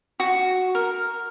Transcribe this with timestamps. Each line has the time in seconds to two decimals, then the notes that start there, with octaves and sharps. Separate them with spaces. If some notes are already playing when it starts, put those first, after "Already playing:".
0.20 F#4
0.75 A#4